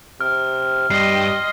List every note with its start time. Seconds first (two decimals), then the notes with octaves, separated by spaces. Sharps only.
0.21 C3 F6
0.90 G2 G3 D#5 C6 C7